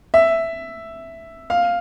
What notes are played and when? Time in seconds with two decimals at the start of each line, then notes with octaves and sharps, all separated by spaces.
0.14 E5
1.50 F5